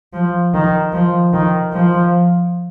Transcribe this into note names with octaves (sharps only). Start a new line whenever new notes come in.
F3
D#3
F3
D#3
F3